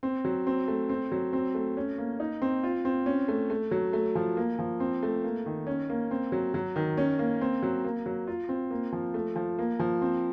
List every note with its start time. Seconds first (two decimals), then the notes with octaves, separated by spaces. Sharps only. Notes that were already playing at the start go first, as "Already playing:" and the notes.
0.03 C4
0.24 F#3
0.47 C4
0.68 A3
0.89 C4
1.12 F#3
1.33 C4
1.55 A3
1.77 C#4
1.98 A#3
2.20 D#4
2.42 C4
2.63 F4
2.85 C4
3.06 C#4
3.28 A3
3.50 A3
3.71 F#3
3.93 A3
4.15 F3
4.37 A#3
4.59 F3
4.80 C4
5.03 A3
5.24 A#3
5.46 D#3
5.67 C#4
5.89 A#3
6.11 C4
6.32 F#3
6.54 F#3
6.76 D#3
6.97 C#4
7.19 A#3
7.41 C4
7.62 F#3
7.84 A#3
8.06 F#3
8.27 F4
8.49 C4
8.70 A#3
8.92 F3
9.14 A3
9.36 F3
9.58 A#3
9.79 F3
10.02 C4